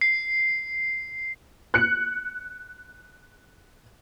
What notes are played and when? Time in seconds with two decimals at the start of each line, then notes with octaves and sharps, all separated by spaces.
0.01 C7
1.74 F#6 C#7